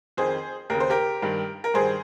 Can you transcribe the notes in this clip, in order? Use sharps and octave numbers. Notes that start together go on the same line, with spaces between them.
F2 D#3 G#4 C5
D#2 C#3 A#4
C5
G4 A#4
G2 D#3
A#4
G2 D#3 G#4 C5